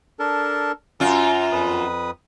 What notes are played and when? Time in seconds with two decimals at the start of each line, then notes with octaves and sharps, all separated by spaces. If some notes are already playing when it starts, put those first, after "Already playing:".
0.19 D4 A4 A#4
1.00 F#2 F4 A#5
1.52 F2 B4 D#6